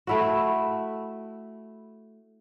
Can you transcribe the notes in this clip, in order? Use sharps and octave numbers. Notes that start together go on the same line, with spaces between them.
A3 E4 F#4